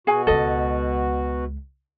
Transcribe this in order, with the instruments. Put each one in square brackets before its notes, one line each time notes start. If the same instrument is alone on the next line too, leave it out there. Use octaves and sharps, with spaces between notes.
[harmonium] B2 F#4 [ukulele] G#4 G#5
[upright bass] C#2 G#3 [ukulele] A4 D#5